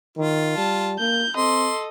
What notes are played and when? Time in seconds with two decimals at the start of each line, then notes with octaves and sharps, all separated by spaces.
0.17 D#3 F4
0.57 G3 A5
0.99 A#3 G6
1.36 C4 A4 D#5 C6